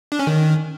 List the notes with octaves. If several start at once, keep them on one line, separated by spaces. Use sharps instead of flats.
D4
C#4
D#3